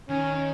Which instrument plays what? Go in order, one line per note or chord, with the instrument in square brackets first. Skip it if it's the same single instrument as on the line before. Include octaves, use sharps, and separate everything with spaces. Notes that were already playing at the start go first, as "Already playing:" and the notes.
[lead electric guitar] D#3 [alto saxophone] C#4